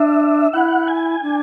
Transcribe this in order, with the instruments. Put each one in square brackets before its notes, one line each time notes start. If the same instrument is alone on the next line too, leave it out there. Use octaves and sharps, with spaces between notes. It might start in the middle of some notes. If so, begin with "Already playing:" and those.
Already playing: [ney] D4 [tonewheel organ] E5
[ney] E4 [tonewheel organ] F#5
[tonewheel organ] G#5
[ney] D4